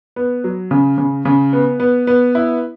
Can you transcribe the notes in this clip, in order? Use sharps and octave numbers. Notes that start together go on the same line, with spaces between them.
B3
F#3
C#3
C#3
C#3
B3
B3
B3
E4